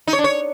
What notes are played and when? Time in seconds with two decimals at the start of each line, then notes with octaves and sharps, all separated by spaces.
0.07 D#4
0.13 C#5
0.19 D4
0.24 C#5